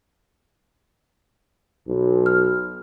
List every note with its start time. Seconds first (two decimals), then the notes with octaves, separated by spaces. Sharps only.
1.88 B1
2.26 F6